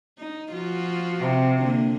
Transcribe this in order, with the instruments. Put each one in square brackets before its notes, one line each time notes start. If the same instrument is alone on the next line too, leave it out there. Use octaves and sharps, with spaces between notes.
[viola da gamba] D#4
F3 F4 F#4
[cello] C3
[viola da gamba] D3 A#3